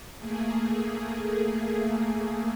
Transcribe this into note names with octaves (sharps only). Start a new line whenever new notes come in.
A3 A#3 G#4